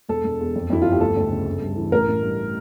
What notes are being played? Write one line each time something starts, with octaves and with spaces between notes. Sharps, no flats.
E1 A4
E1
E2
F2
F2 E4
G1 F4
G4
D2 A4
D2
C#3
G1
G2
E3
A1 A#4
A1
G2